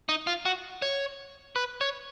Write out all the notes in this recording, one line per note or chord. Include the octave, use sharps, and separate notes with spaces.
D#4
F4
F#4
C#5
B4
C#5